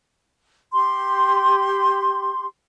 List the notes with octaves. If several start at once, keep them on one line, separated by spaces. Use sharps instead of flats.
G4 C6